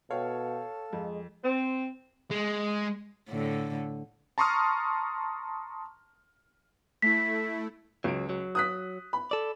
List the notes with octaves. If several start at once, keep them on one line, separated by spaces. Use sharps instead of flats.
B2 A4 C#5 F5 G5
F2 G#3
C4
G#3
A2 D3
A5 A#5 C6 C#6 D#6 F6
A3 E4 B6
C#2 F#3 D7
F#3
D#6 F#6 B6
B5
A4 D5